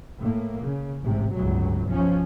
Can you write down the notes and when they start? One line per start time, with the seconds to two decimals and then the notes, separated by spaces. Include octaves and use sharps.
0.19 A2 A#3
0.65 C#3
1.03 A1 G#2 C3
1.34 G1 C#2 A2 F#3
1.88 B1 F3 C#4